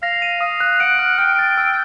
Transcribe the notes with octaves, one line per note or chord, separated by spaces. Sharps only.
F5 A#6
D#7
F5 D#6
F#6
F#5 D7
F6
G5 F6
A6
E6